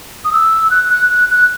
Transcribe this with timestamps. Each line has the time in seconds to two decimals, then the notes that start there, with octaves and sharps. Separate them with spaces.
0.25 D#6
0.33 E6
0.70 F#6
0.91 F#6
1.11 F#6
1.31 F#6